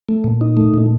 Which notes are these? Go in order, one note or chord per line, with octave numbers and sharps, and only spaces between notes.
A3
A#2
D#4
A3
A#2